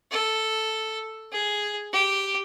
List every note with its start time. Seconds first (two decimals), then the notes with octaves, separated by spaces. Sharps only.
0.11 A4
1.32 G#4
1.93 G4